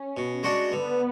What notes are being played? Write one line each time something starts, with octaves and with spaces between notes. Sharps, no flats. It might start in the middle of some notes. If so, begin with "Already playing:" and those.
Already playing: C#4
B2
G#3 D4 F#4
D3 B3